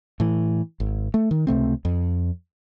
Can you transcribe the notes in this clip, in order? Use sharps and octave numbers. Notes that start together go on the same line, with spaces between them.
A2 E3
G#1
A3
D#3
C#2 C3 A3 C4
F2